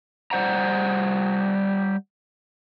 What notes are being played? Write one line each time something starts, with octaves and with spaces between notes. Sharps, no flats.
G3 C5 F#5 A#5